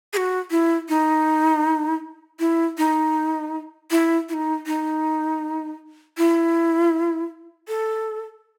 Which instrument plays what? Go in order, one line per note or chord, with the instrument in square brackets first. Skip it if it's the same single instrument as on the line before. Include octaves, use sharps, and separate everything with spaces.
[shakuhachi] G#4
F#4
E4
D#4
E4
D#4
E4
E4
D#4
D#4
E4
A4